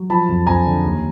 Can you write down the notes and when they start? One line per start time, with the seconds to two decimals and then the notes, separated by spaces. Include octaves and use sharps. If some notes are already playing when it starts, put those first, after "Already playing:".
Already playing: F#3
0.10 F3 A5 B5
0.28 F2
0.46 F2 G#5 A#5
0.65 D3
0.83 D#2